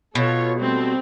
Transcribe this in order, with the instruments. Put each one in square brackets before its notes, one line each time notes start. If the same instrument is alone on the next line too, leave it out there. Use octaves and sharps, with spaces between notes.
[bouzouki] B2 [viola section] F4 A4 C#5
[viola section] G3 A3 C4